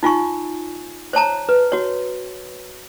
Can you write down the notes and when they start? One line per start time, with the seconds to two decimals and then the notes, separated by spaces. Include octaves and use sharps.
0.03 D#4 F4 G#5 C#6
1.13 C5 C#5 A5 A#5
1.49 B4
1.72 F#4 C#5